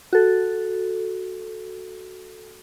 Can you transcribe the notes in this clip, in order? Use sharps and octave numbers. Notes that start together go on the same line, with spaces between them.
F#4 A4